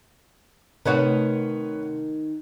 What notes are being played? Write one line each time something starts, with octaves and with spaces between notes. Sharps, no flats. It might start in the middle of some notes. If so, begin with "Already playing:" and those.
C3 D#3 A3 F#4 B4 C#5 F#5